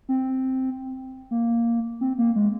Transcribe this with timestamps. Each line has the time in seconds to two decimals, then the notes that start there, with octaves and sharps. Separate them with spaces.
0.09 C4
1.31 A#3
2.01 C4
2.18 A#3
2.36 G#3